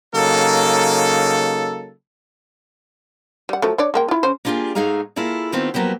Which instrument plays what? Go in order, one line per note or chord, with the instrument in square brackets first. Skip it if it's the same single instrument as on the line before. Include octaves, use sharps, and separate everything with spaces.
[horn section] C#3 F#3 A#3 D#4 A4
[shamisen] G3 F#5
F3 F#3 A3
D4 C#5 D5
G#3 A#3 G5
E4 F4
C#3 C#4 C5
[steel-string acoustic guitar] A#3 D4 F4 G4 G#4 G#5
G#2 A3 D#4 G#4 F5 A#5
A#3 E4 F4 G#4 A4
D#3 A3 B3 C4 F4 G4
F3 F#3 A#3 B3 G4